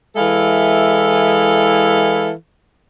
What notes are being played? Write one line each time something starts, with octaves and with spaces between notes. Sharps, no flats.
E3 G#3 E4 A4 E5 F5